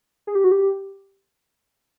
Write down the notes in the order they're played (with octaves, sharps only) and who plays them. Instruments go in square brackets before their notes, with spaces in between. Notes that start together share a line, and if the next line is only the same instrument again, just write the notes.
[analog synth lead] G#4
G4
F#4
G4